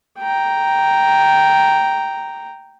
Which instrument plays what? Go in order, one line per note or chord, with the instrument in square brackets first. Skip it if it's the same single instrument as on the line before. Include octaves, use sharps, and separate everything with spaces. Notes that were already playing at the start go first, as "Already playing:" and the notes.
[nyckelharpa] G5 A#5